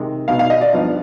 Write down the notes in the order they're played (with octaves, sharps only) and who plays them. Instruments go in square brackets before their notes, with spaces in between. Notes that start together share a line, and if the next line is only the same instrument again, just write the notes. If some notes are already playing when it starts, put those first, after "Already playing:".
Already playing: [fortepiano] C3 D#3 G#3
B2 B3 D#4 F5
F5
D#5
D5
G2 F3 B3 D#4